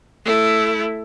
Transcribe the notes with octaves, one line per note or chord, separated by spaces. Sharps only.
A3 E4